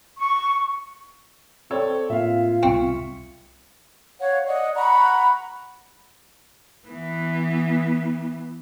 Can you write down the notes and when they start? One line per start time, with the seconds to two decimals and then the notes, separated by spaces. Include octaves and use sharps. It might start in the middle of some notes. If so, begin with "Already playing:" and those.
0.18 C#6
1.71 C4 A4 C#5 D5
2.10 A2 A#3 C4 F4 E5 F5
2.63 C2 C4 C#6 C#7
4.21 C#5 F5 F#5
4.46 D5 D#5 F#5
4.75 F#5 A#5 B5 C#6
6.88 E3 B3